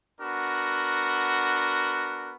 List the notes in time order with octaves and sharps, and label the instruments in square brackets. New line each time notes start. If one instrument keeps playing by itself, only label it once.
[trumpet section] B3 D4 F#4 A#4